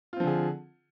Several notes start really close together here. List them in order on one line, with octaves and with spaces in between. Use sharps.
F4 C4 F3 D3 G#4